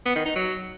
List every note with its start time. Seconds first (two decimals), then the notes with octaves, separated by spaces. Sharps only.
0.06 B3
0.16 D#3
0.26 D#4
0.36 F#3